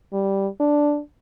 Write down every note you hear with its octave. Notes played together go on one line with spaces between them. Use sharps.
G3
D4